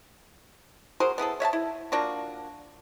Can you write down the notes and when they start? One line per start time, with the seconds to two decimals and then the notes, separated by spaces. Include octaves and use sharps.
1.00 F#4 G#4 A#4 C5
1.18 B3 E4 G#4 A4
1.40 C#5 E5 F#5 A5
1.53 E4
1.92 A#3 D4 F4 F#4